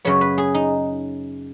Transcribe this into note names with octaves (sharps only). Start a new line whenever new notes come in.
F#2 C#3 F#3 B3 C#5
B4
G#4
D#4